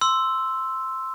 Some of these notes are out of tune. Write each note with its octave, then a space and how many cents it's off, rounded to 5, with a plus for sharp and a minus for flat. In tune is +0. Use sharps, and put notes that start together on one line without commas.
C6 +0 E6 +0